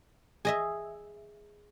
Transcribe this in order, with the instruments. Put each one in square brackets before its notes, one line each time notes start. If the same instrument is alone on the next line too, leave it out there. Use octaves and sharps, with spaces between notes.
[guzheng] G#4 D#5 E5